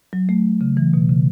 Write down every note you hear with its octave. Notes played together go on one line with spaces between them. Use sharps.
F#3
A3
C#3
E3
B2
C#3